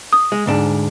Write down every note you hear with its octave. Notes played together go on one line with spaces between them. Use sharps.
D#6
G#3
D2 G#2 D4